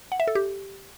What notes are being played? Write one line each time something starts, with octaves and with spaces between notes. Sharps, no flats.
F#5
E5
A4
G4